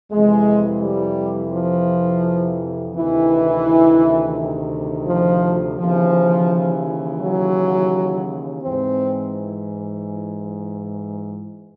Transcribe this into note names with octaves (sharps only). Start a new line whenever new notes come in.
F2 C3 E3 G#3
G3
F3
D2 C3 D#3 E3
F3
D#2 C#3 E3 F3
F#3
G#2 E3 C4